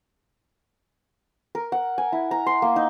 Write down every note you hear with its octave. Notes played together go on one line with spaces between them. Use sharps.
A#4
F#5
G#5
E4
A#5
C6
A#3
D#4